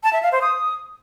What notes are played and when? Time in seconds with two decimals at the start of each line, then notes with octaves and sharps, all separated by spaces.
0.03 A5
0.13 E5
0.23 F5
0.32 C5
0.42 D#6